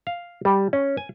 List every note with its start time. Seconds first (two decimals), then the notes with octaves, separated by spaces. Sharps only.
0.07 F5
0.45 G3
0.73 C#4
0.97 G#5